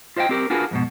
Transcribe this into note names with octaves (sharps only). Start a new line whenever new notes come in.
F4 C5 D#5 E5 G5
C4 G4 A#4
D4 F4 F#4 G#4 A#4 B4
F2 G#2 B2